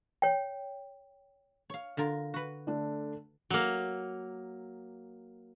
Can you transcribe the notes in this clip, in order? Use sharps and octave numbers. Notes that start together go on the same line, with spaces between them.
C#5 G5
C#5 F5
D3 F4 A#4
F#4 B4
D3 A3 D4
F#3 A#3